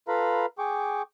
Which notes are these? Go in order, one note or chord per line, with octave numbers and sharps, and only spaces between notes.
F4 A4 B4 F5 A#5 B5
G#4 G5 C#6 D6